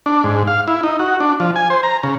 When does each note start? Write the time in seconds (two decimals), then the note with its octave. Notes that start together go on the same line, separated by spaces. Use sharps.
0.06 D4
0.24 G#2
0.47 F5
0.68 E4
0.83 D#4
0.99 F#4
1.20 D4
1.40 F3
1.56 G#5
1.70 C5
1.83 A#5
2.03 C#3